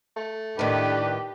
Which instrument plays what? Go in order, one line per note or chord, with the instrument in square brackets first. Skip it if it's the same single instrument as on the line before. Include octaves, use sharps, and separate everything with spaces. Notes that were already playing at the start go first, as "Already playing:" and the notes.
[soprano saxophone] A3
[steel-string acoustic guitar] A2 D#3 [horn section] D4 B4 [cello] G4